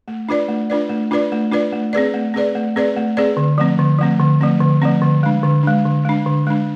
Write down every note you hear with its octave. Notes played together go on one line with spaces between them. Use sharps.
A3
D4 F4 B4 D5
A3
D4 F4 B4 D5
A3
D4 F4 B4 D5
A3
D4 F4 B4 D5
A3
C4 G#4 B4 D5
A3
C4 G#4 B4 D5
A3
C4 G#4 B4 D5
A3
C4 G#4 B4 D5
D3
F3 A3 C4
D3
F3 A3 C4
D3
F3 A3 C4
D3
F3 A3 C4
D3
G#3 D4
D3
G#3 D4
D3
G#3 D4
D3
G#3 D4